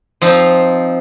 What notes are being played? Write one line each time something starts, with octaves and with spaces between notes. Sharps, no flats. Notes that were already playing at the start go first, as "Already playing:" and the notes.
F3 C4 D#4